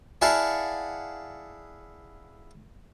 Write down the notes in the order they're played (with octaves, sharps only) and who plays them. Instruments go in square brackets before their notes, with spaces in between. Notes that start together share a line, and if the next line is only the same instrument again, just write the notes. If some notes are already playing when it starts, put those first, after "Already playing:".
[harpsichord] E4 G#4 D5 F5 F#5 A5